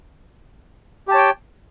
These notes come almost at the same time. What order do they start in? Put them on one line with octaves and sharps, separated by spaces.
G4 A5 C#5 G5